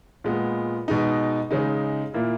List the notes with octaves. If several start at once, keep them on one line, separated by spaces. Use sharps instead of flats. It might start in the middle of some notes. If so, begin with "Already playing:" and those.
A#2 G#3 B3
B2 G#3 D#4
C#3 G#3 D#4
A#2 A#3 E4